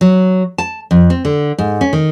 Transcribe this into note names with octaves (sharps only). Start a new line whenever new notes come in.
F#3
A5
F2
C4
D3
G#2
C#4
D#3